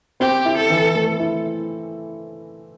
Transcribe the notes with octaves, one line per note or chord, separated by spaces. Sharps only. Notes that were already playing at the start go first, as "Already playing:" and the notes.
C4 G4
E4
A4
E3
A3
E4